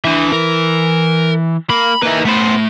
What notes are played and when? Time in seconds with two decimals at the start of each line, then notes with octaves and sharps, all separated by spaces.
0.05 E3 D4 E5
0.32 A#4
1.70 A#3 B5
2.03 A#3 D#4 B4 E5
2.25 A3 B3 C5 B5